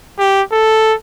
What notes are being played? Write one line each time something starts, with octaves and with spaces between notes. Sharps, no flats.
G4
A4